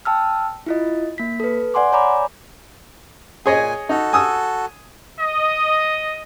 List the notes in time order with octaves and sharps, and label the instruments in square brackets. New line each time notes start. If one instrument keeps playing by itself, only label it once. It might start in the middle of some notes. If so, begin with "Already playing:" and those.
[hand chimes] G5 A5 E6 F6
E4 F4 D#5
A#3 B6
A4 B4
D5 F#5 G#5 C6 D6
C#5 D5 G#5 A#5 B5 D6
[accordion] A#2 G#5 [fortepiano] G#4 C#5 D#5
[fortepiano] D#4 [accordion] F#4 A4
[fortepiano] G#5 D#6 E6
[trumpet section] D#5